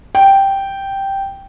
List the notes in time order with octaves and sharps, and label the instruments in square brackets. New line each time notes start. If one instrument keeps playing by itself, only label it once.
[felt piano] G5